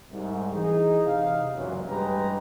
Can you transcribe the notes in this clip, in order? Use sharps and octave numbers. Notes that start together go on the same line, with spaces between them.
C2 G#2
E3 D#4 G#4
C3 D#4 F5
C#2 F#2 A#2 E3 F#3
A1 G2 G#3 G4 B4 A#5